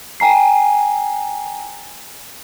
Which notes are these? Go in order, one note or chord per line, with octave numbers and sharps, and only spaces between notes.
G5 G#5 A#5 C7